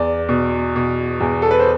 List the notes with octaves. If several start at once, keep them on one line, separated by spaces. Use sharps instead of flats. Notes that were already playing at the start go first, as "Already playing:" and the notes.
Already playing: E2 D5
B2
B2
E2
A4
B4
C5